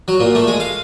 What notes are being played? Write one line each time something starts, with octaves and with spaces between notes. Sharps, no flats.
F#3
A#2
A3
G#3
F5